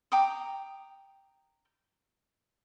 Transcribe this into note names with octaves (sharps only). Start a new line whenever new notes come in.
G5 A#5 D6 D#6